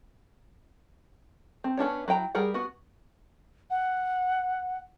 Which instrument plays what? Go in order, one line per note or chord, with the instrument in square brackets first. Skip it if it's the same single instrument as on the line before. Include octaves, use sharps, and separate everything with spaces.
[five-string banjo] C4
B3 C#4 D4 C#5
F#3 E4 G5 A#5
G3 G#4 A#4 F#5
B3 F#4
[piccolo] F#5